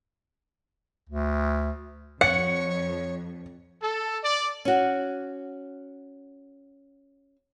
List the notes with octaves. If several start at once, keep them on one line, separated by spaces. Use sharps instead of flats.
D2
F2 C#5 F#5 C#7
A4
D5
C#4 F#4